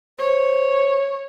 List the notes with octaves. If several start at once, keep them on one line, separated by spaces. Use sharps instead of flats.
C5 C#5